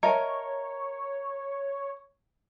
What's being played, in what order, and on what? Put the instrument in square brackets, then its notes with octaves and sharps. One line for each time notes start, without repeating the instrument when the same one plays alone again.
[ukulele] A#4 [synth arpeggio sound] C#5 [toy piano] D#5 E5 A5